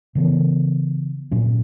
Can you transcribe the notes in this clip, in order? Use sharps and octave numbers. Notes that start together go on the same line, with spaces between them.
C#3 E3 B3
A#2 F#3 C#4